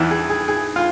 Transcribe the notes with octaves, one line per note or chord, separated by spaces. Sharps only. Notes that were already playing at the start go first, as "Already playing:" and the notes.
Already playing: E2 E3
G#4
G#4
G#4
F4